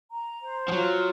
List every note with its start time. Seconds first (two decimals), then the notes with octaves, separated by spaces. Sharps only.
0.10 A#5
0.41 C5
0.68 F3
0.72 F#3 F4